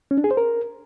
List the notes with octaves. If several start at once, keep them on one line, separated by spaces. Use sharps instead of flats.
C#4
D4
G#4
C5
A#4